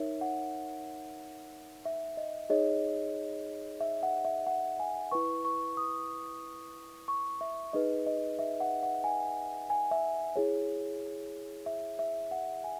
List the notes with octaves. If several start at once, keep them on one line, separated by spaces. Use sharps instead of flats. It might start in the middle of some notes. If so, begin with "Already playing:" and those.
Already playing: D#4 A#4 C#5 E5
F#5
E5
D#5
D#4 G#4 C#5 D#5
E5
F#5
E5
F#5
G#5
E4 B4 C#6
C#6
D#6
C#6
E5
D#4 G#4 B4 D#5
D#5
E5
F#5
F#5
G#5
G#5
E5
E4 G#4 C#5
E5
E5
F#5
G#5